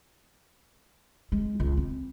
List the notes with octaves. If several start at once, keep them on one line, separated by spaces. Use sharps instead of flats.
G#3
C#2
C4